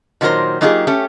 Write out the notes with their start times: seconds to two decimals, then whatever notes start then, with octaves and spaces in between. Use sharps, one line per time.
0.21 A#2 D#3 F#3 G#3 A#4 C5
0.61 F#3 A#3 D#4 F4 G4 G#4
0.87 A3 C#4 G4